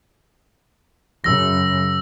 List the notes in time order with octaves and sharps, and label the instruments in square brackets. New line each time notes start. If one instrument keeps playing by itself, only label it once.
[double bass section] F#2 C#3 [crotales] E6 A#6